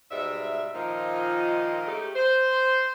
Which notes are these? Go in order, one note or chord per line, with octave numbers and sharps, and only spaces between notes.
G#2 B2 G3 E5
A#2 D#3 F3 D#4 F4 D#5
G#3 A3 C#4 D#4 G4
C5